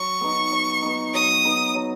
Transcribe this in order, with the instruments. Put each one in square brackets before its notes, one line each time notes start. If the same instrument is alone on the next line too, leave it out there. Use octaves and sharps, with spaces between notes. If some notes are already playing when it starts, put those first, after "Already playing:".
Already playing: [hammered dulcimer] F#3 [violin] C#6
[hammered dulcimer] B3 D#4
F#3
B3 D#4
[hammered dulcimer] F#3 [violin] D#6
[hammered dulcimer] B3 D#4
F#3